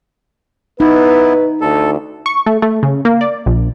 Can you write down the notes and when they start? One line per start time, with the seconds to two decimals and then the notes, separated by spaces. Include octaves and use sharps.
0.80 B3 D#4 E4 B4
1.61 D2 A4
2.26 C#6
2.46 A3
2.62 A3
2.83 C#3
3.05 A#3
3.21 D5
3.46 A#1